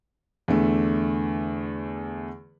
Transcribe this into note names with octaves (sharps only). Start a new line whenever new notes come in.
E2 D3 A3